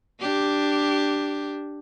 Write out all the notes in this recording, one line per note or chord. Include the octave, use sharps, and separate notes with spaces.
D4 G4